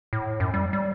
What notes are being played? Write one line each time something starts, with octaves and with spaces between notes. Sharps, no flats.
A2
F#2
G3
G3